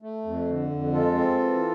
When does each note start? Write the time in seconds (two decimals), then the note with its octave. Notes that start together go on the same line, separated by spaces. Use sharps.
0.02 A3
0.24 F2
0.48 D3
0.70 F2
0.92 G#3 F4 A4
1.15 C4
1.39 E3